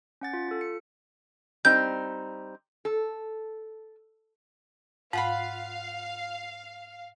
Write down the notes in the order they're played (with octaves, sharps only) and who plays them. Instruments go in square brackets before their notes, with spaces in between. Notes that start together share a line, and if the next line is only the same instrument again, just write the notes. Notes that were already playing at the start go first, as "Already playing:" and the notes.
[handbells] C#4 F#5 A6
F4
F4 A4
C#7
[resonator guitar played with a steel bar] G3 C4 D#4 [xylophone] G6
[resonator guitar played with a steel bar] A4
[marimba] G#2 [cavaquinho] F4 F#5 B5 [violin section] F5